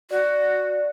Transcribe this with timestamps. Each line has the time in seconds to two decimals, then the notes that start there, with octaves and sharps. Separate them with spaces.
0.11 F#4 D5